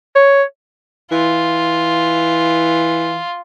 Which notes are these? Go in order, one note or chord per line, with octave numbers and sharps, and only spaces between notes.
C#5
E3 F4